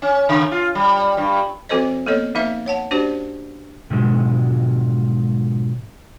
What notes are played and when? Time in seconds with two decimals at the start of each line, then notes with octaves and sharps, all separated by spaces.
0.02 C#4
0.29 C#3
0.52 F4
0.75 G3
1.17 G2
1.69 F3 C4 F#4 A4 C5 D#5
2.06 A#3 B3 A4 C#5 D#5
2.35 F3 A#3 D#4 B4 E5 F5
2.66 C#5 F#5 A5
2.91 C#4 D4 F#4 G4 C5 D5
3.90 G#2 B2 D3 F3 F#3 G#3